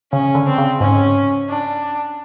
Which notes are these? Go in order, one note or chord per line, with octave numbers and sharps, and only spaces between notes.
C#3 C#4
D3
C4
C#3
G#2 C#4
D4